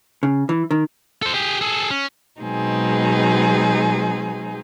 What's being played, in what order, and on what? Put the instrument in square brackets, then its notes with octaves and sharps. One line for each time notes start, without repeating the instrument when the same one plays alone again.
[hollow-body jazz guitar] C#3
E3
D#3
[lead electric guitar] A4 C5
G4 G#4
G#4 A4
C#4
[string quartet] B2 F#3 G#3 C4 D#4 G#4